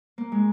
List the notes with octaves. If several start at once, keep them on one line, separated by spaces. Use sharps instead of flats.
A#3
G#3